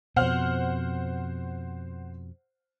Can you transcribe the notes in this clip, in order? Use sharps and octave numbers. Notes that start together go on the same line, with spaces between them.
F2 B2 C5 F#5 F6